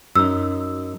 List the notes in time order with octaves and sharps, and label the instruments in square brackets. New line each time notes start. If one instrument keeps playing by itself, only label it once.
[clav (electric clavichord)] F#2 D#4 [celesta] E6